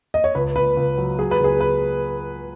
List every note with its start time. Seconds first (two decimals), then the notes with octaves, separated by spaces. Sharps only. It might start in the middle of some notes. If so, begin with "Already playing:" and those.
0.14 D#5
0.24 C#5
0.35 C#2 B4
0.56 C#2 B4
0.77 C#2
0.98 F#3
1.19 F#3 G#4
1.31 B4
1.40 C#2 G#4
1.60 B4